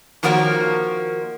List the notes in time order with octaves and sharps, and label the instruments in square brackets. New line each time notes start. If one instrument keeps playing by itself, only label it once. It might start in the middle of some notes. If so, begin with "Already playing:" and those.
[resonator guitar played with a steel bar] D#3 F3 A#3 F#4 A#4 C#5